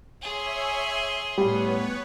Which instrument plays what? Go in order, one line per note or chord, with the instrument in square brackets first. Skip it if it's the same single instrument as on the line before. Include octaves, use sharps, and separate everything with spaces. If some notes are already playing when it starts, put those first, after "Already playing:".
[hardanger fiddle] G#4 C6 [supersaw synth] C#5 E5 G#5
[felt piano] A2 G3 [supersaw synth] B3 B4 C#5 [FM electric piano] G4